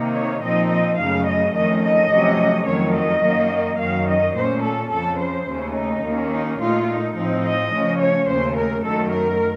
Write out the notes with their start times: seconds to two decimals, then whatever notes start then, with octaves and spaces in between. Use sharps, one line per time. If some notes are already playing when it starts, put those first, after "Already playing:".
Already playing: C3 D#3 A#3 D#4
0.15 C#5
0.43 A#2 F3 C4 D#4 D#5
0.71 D#5
0.99 F#2 C#3 A3 F5
1.27 D#5
1.55 F2 D#3 A3 C#4 D#5
1.83 D#5
2.11 F2 C3 F#3 A3 C#4
2.67 F2 D#3 F#3 A3 C#5
2.96 D#5
3.23 F#2 D#3 F#3 A#3
3.79 F#2 D#3 F#3 F5
4.07 D#5
4.35 A#2 A3 C#4 C5
4.64 A4
4.91 F2 C#3 F3 A4
5.20 C5
5.47 D#2 C#3 A3 C#4
5.76 D#4
6.03 D#2 D#3 A#3 C#4
6.32 D#4
6.60 A#2 A3 D#4 F4
6.88 D#4
7.16 A2 F3 C4 D#4
7.44 D#5
7.72 C#3 F3 A3 C#4
8.00 C#5
8.28 D#2 C#3 A3 C5
8.56 A#4
8.84 F#2 D#3 F#3 A3 A4
9.12 A#4